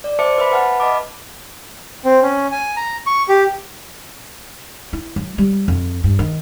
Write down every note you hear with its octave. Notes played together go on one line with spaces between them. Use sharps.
D5
C5 E5 A5 D6 C#7
B4 E5 B5
B4 E5 F#5 A5 F6
D#5 A5 B5 D6
C4
C#4
G#5
A#5
C#6
G4
E4
F#3
G3
F2
G2
D#3